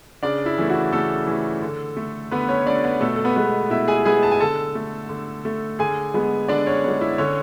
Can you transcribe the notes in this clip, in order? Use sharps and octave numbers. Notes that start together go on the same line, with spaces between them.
C#3 D4 D5
E4
E3 A3
F#4
C#3 A3 A4
E3 A3
D3
A3
D3 B3 B4
C#4 C#5
A3 D4 D5
B3 B4
B2 A3 A4
A4
B3 B4
G#3 B3
B2 E4 E5
G#4 G#5
G#3 B3 G#4 G#5
A5
G#5
D3 A4 A5
A3
D3
A3
D3 G#4 G#5
G#3 B3
D3 D4 D5
C#4 C#5
G#3 B3
E4
D3 C#4 C#5